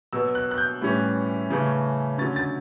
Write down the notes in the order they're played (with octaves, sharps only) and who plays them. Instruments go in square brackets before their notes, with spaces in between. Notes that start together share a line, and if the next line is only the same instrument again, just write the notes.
[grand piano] B2 F#3 B3 E6
F#6
F#6
G6
A2 E3 G3 C#4
C#3 E3 A3 C#4
D3 F#3 C#4 A6
A6